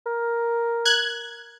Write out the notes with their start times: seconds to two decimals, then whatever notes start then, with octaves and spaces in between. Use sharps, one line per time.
0.06 A#4
0.85 F#6 G#6